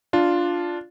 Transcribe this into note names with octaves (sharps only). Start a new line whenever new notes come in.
D4 F4